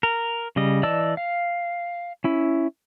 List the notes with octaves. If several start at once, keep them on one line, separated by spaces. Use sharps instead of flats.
A#4
C#3 G3 D#5
E3 D5 D#5 A5 E6
F5
C#4 E4